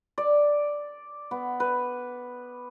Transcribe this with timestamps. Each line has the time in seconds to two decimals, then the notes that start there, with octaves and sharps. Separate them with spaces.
0.18 D5
1.31 B3
1.60 B4